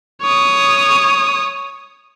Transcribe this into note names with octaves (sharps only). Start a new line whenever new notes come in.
C#5 D#6